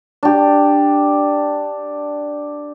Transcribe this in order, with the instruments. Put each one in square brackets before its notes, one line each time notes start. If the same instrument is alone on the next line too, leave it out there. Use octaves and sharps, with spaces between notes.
[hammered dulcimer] D4 G4